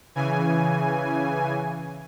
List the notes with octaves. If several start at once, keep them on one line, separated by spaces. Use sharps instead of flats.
C#3 E3 G#5